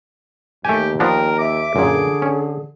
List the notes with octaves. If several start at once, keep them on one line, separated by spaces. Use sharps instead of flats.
D#2 A3 G4 G#5
F3 B3 D4 A#4 G5
E5 D6
F#2 A#2 D3 G#4
C#4